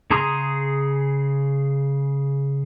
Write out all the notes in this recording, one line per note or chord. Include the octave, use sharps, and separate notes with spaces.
C#3 G#4 A#5 C6 D#6